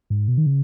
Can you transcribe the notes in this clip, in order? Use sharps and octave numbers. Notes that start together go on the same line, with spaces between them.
G#2
B2
D#3
C#3